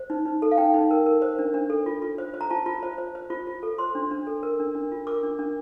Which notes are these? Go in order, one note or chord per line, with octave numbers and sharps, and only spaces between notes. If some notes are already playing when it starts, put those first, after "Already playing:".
Already playing: C5
D#4
D#4
A4
F5
D#4 G5
D#4
A#4
A#4
C5
D4
D4
A4
F4
F4
C5
C5
A#5
F4 A5
F4
C5
C5
C5
F4
F4
A4
C5 C6
D4
D4
A4
A#4
D4
D4
F4
A#4 D6
D4
D4